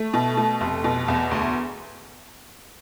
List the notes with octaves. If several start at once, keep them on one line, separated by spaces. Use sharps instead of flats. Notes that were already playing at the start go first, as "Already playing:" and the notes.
Already playing: A3
B2
A3
F1
B2
E2
D2